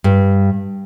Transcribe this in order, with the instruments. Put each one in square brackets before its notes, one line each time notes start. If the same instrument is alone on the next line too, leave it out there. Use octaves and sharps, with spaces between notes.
[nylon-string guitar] G2